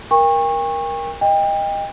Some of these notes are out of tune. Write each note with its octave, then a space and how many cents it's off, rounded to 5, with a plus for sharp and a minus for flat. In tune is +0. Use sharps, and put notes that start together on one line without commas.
A#4 +15 G5 +40 C#6 -20
D#5 +0 G5 +30